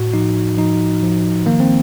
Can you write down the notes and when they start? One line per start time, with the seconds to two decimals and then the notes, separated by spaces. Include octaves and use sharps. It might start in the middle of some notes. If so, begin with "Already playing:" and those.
Already playing: A2 F#4
0.14 F3 D#4
0.58 F3 D#4
1.02 F3
1.46 D#3 A#3
1.60 C4